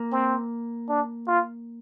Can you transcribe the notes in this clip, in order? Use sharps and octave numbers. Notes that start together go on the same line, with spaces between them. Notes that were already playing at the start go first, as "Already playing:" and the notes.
Already playing: A#3
C4
D4
F4